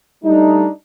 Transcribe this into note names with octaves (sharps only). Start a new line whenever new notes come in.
G3 A3 D4 D#4